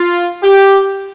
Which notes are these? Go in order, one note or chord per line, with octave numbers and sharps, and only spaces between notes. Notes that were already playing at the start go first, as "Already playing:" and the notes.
Already playing: F4
G4